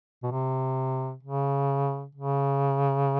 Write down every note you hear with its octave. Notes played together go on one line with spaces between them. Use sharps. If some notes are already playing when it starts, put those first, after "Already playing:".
B2
C3
C#3
C#3